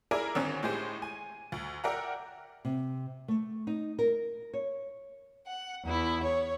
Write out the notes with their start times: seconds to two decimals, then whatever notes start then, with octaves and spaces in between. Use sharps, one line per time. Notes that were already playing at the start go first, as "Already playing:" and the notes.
0.11 E4 G#4 A#4 D5 A#5
0.35 G#1 D3 C4 C#4 C#5
0.63 A2 G#3 G4 G#4 C5
1.02 G#5
1.52 D2
1.84 A#4 D5 E5 F#5 G5 A#5
2.65 C3
3.28 A3
3.67 D#4
3.99 A#4
4.53 C#5
5.46 F#5
5.84 E2 E4
6.24 C#5